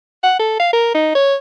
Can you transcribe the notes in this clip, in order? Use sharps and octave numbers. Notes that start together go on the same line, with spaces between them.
F#5
A4
F5
A#4
D#4
C#5